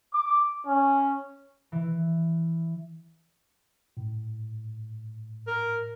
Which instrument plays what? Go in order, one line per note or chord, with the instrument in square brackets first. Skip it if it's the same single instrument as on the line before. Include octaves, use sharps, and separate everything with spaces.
[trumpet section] D6
C#4
[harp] E3
[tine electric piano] A2
[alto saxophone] A#4